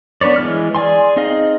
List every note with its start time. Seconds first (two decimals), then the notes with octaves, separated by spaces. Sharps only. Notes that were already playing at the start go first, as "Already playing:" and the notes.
0.21 B3 D4 B4 C#5 D5
0.36 E3 G#3 F6
0.75 G#4 D5 G#5 C6
1.16 C4 D#4 G#4 D#5 F5